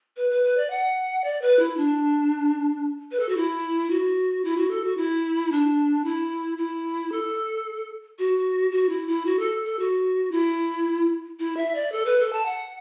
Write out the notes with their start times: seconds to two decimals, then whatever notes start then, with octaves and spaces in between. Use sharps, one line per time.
0.17 B4
0.30 B4
0.43 B4
0.57 D5
0.70 F#5
1.24 D5
1.42 B4
1.59 E4
1.77 D4
3.11 B4
3.20 A4
3.29 F#4
3.37 E4
3.90 F#4
4.44 E4
4.57 F#4
4.71 A4
4.84 F#4
4.97 E4
5.52 D4
6.04 E4
6.58 E4
7.12 A4
8.19 F#4
8.71 F#4
8.89 E4
9.07 E4
9.26 F#4
9.39 A4
9.65 A4
9.79 F#4
10.31 E4
11.39 E4
11.57 E5
11.75 D5
11.92 A4
12.06 B4
12.20 A4
12.33 A5
12.46 F#5